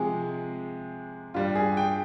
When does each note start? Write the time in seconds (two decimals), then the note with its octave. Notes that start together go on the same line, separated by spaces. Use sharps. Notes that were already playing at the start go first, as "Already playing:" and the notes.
Already playing: C3 F3 G#3 G#4
1.34 G2 G3 F4
1.55 G#4
1.77 G5